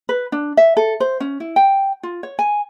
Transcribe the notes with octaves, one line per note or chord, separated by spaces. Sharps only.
B4
D4
E5
A4
C5
C#4
E4
G5
F4
C#5
G#5